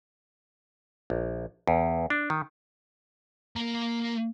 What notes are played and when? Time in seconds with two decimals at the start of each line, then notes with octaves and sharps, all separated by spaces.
1.10 A#1
1.68 E2
2.10 D4
2.30 D#3
3.56 A#3 A#5